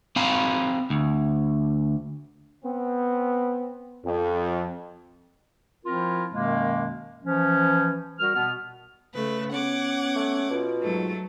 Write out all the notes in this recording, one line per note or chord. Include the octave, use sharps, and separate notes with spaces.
C4 F5 G#5 A#5 B5
D2
B3 C4
F2
F3 C4 E4 F4 A#4
F#2 B2 D#3 G#3 A#3
E3 F3 C#4
G3 F#4 A#4 F6
B2 B3 F6
C#3 A3 B4
B3 C#4 F#5 D6 G#6
A3
B2 F4
G#2 F#3 A3